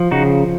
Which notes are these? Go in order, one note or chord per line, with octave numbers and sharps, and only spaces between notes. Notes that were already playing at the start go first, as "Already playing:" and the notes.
Already playing: F3
C#3 D#4 F#4